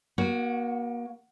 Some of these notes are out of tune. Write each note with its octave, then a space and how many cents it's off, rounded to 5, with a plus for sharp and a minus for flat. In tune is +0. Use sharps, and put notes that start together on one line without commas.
A#3 +35 F#4 +0